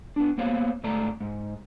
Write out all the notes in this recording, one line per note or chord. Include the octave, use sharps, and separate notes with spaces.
B3 D4
A#3 B3 C5 C#5 F5
G#2 A3 D5 A#5
G#2